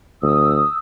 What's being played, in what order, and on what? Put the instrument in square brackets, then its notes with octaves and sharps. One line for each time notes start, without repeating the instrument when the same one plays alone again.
[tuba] D2 [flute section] D#6 E6